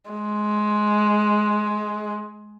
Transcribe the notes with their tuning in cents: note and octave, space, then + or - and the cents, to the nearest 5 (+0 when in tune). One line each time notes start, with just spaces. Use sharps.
G#3 +15